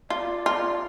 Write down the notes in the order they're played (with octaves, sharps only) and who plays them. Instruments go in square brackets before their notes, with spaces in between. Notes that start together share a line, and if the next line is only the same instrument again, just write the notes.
[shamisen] F4 [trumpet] D5
[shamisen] F4